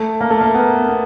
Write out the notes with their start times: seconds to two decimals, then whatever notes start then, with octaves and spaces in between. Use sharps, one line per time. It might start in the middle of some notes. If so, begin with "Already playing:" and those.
Already playing: A3
0.21 A#3
0.30 A3
0.41 A#3
0.54 B3
0.88 B3